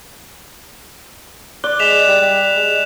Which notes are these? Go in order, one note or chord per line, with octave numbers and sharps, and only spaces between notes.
D5 F#6 G7
G#3 B6 E7 F7
G3
G3
G#3